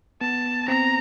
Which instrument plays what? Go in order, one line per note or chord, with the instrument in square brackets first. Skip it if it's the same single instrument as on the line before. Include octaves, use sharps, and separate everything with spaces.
[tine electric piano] B3 [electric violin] A5
[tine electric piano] C4 [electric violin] A#5